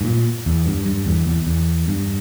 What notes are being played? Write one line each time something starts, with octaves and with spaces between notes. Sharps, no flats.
G#2
A#2
E2
G2
G2
E2
E2
E2
G2